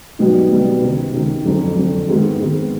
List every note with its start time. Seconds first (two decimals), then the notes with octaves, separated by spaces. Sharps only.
0.19 B1 B2 G3 B3 D#4
0.50 B1 B2 G3 B3 D#4
0.82 C#2 C3 D#3
1.14 C#2 C3 D#3
1.45 F#1 F2 D3
1.76 F#1 F2 D3
2.08 G#1 G#2 D#3 G#3 B3
2.39 G#1 G#2 D#3 G#3 B3